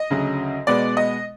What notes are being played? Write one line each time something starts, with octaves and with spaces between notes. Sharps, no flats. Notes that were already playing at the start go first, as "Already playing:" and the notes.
Already playing: D#5
D2 C#3 F#3
B2 G#3 B3 D5
D#5